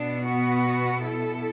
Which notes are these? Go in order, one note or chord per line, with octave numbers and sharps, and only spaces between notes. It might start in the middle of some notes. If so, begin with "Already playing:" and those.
Already playing: B2 B3 D4
F#4 B4
E4 A4